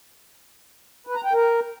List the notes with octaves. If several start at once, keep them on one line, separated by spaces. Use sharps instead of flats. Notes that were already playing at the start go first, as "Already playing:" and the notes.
B4
A#5
G5
A#4